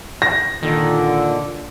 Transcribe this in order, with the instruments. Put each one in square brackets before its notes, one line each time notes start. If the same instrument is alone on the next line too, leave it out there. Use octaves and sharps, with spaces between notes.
[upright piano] A#6
[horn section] A#2 D3 [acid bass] D#3